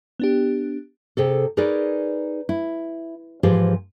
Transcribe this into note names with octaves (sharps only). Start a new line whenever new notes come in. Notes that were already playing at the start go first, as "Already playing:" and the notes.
B3 D4 G4
C3 G#4 A4
D#4 G#4 A#4 B4 C#5 D5
E4
G#2 E3 F3 G4 G#4 F5